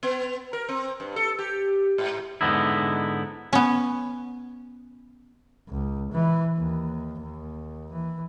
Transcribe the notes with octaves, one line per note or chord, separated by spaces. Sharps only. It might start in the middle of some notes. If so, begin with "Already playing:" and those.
B3
A#4
C4
G2
A4
G4
G#2
G#2 D3 B3 D#4 E4
B3 C#4
C#2
E3
D#2
D#2
E3